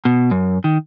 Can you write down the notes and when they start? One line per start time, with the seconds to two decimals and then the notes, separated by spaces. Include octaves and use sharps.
0.05 B2
0.31 F#2
0.64 D#3